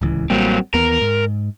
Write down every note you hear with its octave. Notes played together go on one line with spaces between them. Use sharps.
D1 C#2 E3
A1 F#3 G3 A#3 C4
D#2 E3 B3 A#4
G#2